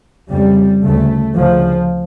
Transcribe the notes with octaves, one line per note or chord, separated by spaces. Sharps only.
F2 C#3 G3
D2 C#3 A3
D2 C#3 F3